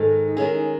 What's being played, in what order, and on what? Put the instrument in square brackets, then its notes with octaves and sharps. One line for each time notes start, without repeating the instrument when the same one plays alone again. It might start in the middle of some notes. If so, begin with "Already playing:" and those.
Already playing: [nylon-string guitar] G#2 D#3 G#3 [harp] A4
[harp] D#4
[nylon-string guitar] D#3 G#3 C#4 G#4 [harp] E4
[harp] D#4